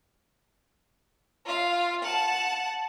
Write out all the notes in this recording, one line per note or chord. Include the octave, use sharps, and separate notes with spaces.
F4 F5
F#5 A5